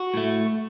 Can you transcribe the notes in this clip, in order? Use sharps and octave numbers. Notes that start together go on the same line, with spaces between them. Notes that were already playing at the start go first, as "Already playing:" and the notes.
Already playing: F#4
A2 A3